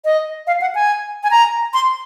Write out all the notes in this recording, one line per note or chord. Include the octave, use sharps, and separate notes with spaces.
D#5
F5
F#5
G#5
G#5
A#5
C6